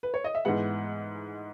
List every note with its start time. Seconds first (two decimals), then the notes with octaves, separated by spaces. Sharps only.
0.03 B4
0.14 C#5
0.24 D#5
0.35 E5
0.45 G#2 E3 G#3 B3 F#5